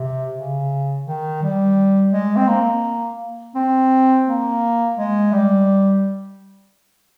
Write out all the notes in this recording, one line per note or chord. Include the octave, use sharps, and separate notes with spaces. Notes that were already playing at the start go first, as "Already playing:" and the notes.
Already playing: C3
C#3
D#3
G3
G#3
C4
A#3
C4
A#3
G#3
G3